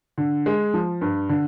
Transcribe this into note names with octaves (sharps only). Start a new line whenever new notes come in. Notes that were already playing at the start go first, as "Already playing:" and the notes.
D3
G#3
F3
G2
D3